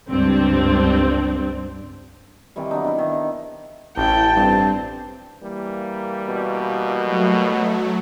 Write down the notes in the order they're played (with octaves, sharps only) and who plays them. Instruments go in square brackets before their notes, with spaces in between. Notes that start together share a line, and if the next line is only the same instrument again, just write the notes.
[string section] C#2 G2 C4 D4
[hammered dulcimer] C3 D#3 E3 G3
F#3 B3 D4 D#4
D4 E4
D#3
D#4
[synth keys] A1 [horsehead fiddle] E4 G5 [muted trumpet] A5
[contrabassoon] G2 [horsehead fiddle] C4
[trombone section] E3 G3 A#3
[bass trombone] B2
[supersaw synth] F#3 A3